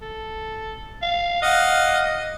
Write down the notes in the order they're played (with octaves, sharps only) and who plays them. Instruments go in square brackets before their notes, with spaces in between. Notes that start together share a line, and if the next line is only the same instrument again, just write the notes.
[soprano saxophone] A4
F5
[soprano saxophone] D#5 [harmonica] F5 F#5